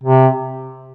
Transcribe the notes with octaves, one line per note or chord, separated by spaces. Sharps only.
C3